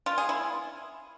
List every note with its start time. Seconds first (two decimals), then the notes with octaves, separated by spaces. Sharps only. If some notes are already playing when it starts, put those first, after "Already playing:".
0.06 F4
0.18 G#4
0.29 E4